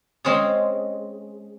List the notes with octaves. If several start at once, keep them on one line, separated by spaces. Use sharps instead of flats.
G#3 C4 C#4 G#4